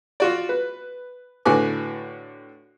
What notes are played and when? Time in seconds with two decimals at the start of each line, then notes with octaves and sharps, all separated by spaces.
0.20 F4 F#4 D5
0.49 B4
1.45 A2 D3 F#4 B4 G#5 D6